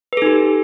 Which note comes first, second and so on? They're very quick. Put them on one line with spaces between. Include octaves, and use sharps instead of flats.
B4 A4 D#4 G4